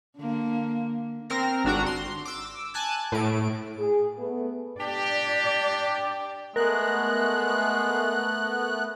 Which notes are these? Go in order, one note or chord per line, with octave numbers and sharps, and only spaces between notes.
D3 A#3
C4 A#4 F6 A#6
G#1 D4 F#4 A#5
C6
D6 E6
G#5 A5 F#6 G#6
A2 D7
G#4
A3 B3
D4 G4 D5
G#3 A3 B3 A#4 F#6